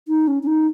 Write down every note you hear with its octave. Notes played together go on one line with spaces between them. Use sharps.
D#4
C#4
C#4
D#4